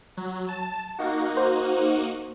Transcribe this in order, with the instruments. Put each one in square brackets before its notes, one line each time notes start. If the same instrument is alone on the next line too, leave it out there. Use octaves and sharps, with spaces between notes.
[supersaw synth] F#3
A5
A#3 D#4 F#4
[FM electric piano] C5